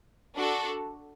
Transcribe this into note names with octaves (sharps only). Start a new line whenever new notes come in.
D4 F#4 A4